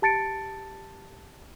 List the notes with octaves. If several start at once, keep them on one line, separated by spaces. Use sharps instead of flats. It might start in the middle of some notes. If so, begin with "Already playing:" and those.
G4 A5 A6 C#7 D7